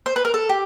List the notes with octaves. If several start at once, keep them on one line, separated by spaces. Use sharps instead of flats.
C5
B4
A#4
A4
G4